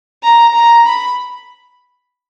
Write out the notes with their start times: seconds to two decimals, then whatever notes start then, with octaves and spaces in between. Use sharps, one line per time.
0.23 A#5
0.54 A#5
0.86 B5